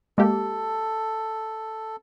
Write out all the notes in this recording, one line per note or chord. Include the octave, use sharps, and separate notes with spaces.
G#3 A#3 G4 A4